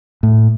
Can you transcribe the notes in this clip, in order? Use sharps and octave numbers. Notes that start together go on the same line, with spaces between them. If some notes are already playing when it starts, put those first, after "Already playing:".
A2